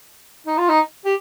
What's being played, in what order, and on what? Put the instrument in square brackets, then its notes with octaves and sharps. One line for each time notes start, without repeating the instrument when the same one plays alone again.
[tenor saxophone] D#4
F4
D#4
G4